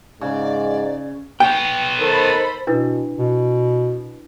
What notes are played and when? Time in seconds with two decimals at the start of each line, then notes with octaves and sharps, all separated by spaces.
0.21 G#2 C#3 D5
1.40 B3 C#5 G5
1.99 D#3 A4 C5 B5
2.67 B2 D4 E4 B4
3.18 B2